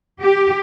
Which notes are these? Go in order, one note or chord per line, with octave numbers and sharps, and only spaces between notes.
G4